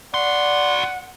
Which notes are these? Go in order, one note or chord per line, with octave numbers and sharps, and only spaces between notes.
F#4 D5 F#5 C6